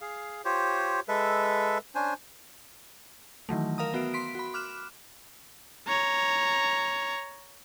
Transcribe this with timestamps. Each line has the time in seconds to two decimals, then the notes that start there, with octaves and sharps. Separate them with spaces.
0.01 G#4 F5
0.45 F4 G4 C5 C#5
1.08 G#3 A4 B4 E5
1.95 C#4 D4 C5 G#5
3.49 D#3 E3 F#3 A3
3.78 A#4 F5 A#5 D#6
3.94 B3 F#4 E5 D7
4.14 C6 B6 D7
4.35 F#4 B5
4.54 D6 F6 F#6 E7
5.88 C#5 A#5